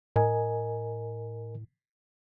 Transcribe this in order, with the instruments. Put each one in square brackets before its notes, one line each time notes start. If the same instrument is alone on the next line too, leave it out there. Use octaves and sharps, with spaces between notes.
[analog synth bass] A2 [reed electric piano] A#4 D#5 G#5